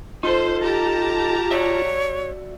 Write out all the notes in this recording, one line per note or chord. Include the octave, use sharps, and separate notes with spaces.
D#4 F4 A4 C5
G4 A5 A#5
F#4 C#5 D5 E5